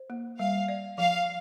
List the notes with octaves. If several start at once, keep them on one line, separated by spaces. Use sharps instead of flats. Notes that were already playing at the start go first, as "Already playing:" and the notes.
Already playing: C5
A#3
G3 F5
D5
F3 F5